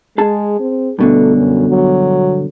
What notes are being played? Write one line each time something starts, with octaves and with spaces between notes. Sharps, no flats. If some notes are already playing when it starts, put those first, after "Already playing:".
G#3 G#4 A5
C4
G2 B2 D3 A3
F#2
F#3